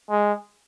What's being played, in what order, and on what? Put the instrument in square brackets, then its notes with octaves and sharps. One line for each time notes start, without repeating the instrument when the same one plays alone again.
[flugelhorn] G#3